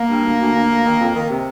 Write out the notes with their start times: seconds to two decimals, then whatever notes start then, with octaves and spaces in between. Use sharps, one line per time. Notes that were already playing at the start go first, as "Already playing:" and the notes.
Already playing: A#3
0.09 G2
0.24 D2
0.39 D2
0.53 D2
0.69 D2
0.84 D#3
0.99 F2
1.14 D#3
1.29 C3